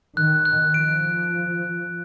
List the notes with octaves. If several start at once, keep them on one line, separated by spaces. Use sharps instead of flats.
D#3 F#6
F#6
F3 D7